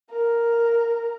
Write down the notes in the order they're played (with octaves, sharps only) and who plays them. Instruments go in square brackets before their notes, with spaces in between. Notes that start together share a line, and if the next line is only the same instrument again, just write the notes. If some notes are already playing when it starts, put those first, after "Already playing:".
[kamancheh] A#4